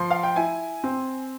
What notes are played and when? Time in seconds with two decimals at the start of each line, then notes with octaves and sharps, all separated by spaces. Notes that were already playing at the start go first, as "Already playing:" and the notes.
Already playing: F3 C6
0.10 F5
0.23 G5
0.36 E4 G#5
0.84 C4